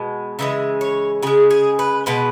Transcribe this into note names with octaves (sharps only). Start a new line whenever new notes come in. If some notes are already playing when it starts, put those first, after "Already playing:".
Already playing: B2 G#3
C#3 E3 G#3 E5
C#5
C#3 G#3 G#4
G#4
B4
B2 G#3 B4